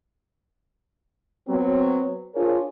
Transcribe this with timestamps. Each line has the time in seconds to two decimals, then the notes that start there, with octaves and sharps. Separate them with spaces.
1.48 F#3 B3 C4
2.35 D4 F4 G#4 A#4 C5 C#5